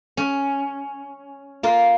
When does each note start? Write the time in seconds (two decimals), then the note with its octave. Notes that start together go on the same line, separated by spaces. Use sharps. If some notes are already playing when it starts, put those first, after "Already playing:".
0.17 C#4
1.63 A#3 F4